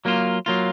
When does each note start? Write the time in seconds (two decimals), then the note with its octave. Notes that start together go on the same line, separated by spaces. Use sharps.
0.05 F#3 A#3 F4
0.46 F#3 A#3 F4